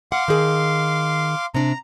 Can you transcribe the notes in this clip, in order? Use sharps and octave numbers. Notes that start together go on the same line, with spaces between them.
F5 F#5 C6 D6
D#3 G#4
C3 D4 A#5